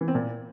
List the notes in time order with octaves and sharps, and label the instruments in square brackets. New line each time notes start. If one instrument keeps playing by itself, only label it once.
[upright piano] E3
C4
A#2